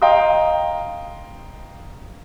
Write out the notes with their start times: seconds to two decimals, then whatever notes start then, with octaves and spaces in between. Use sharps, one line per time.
0.02 D#5 F5 G5 A#5 C6 D#6